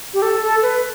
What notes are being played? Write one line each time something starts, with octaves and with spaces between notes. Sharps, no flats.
G4
A4
A4
B4